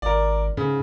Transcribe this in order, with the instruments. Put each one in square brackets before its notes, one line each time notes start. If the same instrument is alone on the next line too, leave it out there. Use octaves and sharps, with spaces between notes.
[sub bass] G#1 [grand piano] A#4 D5
[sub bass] G#2 [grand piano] C#3